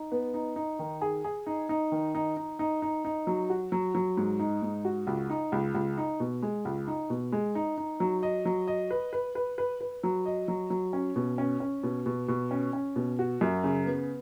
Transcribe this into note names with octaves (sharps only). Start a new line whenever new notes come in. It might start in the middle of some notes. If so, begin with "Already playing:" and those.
Already playing: D#4
B3
D#4
D#4
D#3
G#4
G#4
D#4
D#4
D#3
D#4
D#4
D#4
D#4
D#4
F#3
F#4
F#3
F#3
G#2
D#4
G#2
F#4
C#2
D#4
C#2
C#2
D#4
B2
G#3
C#2
D#4
B2
G#3
D#4
D#4
F#3
D#5
F#3
D#5
B4
B4
B4
B4
B4
F#3
D#5
F#3
F#3
C#4
B2
C#4
C#4
B2
B2
B2
C#4
C#4
B2
F#4
F#2
C#3
B3